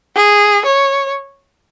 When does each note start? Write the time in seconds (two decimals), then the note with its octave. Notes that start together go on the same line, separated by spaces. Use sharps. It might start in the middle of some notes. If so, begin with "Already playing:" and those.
0.16 G#4
0.65 C#5